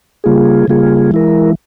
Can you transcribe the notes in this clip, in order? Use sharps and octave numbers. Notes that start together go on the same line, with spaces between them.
C#3 G3 A#3 F4 G#4
C#3 G3 A#3 F4 G#4
E3 G#3 E4 A#4